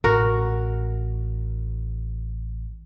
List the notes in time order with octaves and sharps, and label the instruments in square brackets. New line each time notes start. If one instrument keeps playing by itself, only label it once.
[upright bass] A1 G#3 [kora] F#4 A#4